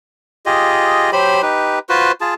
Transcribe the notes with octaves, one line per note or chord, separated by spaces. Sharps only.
F4 G4 G#4 D#5
F#3 G4 C5 B5
D#4 G4 B4
F4 F#4 B4 C5
F4 G#4 A5